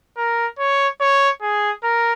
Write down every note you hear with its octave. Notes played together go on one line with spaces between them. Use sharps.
A#4
C#5
C#5
G#4
A#4